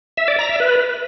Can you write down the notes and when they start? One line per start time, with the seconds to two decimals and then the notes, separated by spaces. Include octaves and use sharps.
0.17 E5
0.28 D5
0.39 A#5
0.49 E5
0.60 B4